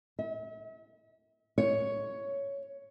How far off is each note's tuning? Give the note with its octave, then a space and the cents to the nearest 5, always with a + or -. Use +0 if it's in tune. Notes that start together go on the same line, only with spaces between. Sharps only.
E5 -40
C#5 +5